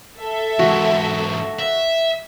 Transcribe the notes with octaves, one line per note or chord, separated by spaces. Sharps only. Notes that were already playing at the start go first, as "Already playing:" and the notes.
A4 E5
E2 G#2 F#4
E5